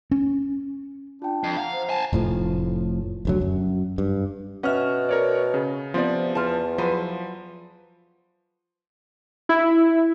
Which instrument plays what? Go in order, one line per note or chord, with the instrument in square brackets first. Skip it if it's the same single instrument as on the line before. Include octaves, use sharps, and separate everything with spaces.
[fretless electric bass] C#4
[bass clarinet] D4 [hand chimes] F4 G5
[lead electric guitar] F2 [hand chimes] C7
[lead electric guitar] F5 [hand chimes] F#5 A#5
[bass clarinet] C5
[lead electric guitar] G#5 A5
[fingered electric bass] F1 A2 F3
F1 D2 F#3
F#2
G2
[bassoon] B2 [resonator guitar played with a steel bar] C#4 E5 [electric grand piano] F#5 F6
[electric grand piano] A#4 C#5 D5
C#3
[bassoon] C3 [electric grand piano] F3 B3 [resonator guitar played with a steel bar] C4 D5
[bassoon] E2 [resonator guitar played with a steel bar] F4 A5
[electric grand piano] F3 [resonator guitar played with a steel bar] F#3 B4 C5
[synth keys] E4